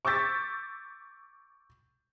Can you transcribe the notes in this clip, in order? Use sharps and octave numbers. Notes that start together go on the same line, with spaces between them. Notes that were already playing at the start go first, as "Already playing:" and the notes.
C#6 D6 E6 G6 A6 B6